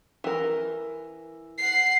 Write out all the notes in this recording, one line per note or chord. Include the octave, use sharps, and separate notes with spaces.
E3 A#4
F#5 C7